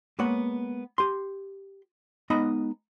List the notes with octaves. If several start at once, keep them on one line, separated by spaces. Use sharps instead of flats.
G#3 A#3 B3 C#5 F#5
G4 C6
G#3 B3 D#4 D#5 A#5 B5